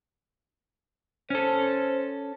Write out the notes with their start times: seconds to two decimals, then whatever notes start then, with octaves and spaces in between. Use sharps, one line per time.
1.30 C#4 A4 C5